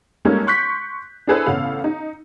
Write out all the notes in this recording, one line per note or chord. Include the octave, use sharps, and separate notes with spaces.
G3 G#3 A#3 C#4 D#4 A4
C6 C#6 F#6 G6 B6
D4 E4 G#4 A4 B4 C5
A1 C#3 B3 A4 F5
D#4